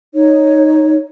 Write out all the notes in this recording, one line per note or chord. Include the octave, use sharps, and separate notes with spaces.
D#4 C#5